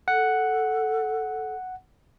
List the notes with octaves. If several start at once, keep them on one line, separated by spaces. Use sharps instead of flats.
A4 F#5